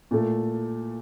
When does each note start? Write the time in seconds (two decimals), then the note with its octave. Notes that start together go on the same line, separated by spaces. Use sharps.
0.11 A#2 A3